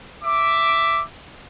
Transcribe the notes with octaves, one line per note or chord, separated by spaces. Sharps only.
E5 D6